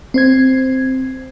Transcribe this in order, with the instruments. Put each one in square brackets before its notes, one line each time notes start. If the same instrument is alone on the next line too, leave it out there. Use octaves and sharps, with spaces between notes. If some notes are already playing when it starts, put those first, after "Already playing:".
[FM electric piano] C4 C5 G#6